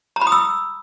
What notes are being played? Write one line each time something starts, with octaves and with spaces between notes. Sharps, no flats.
A#5
B5
D#6
E6